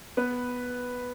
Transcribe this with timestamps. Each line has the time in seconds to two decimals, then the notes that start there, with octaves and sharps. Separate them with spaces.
0.17 B3 B4